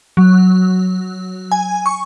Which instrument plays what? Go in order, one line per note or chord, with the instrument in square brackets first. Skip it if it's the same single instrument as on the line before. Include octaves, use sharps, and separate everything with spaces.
[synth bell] F#3
G#5
C#6